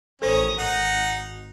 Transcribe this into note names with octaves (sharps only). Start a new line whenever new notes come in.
A1 D#3 C#4 A4 C5 D#6
G#1 D#4 F#5